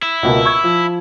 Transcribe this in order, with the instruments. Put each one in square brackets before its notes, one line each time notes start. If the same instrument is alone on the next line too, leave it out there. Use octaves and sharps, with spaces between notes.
[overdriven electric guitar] E4
[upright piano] C#2 B2 A#3
C#6 E6 G#6
F3